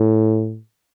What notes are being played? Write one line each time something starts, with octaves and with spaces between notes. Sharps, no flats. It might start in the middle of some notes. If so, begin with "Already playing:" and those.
Already playing: A2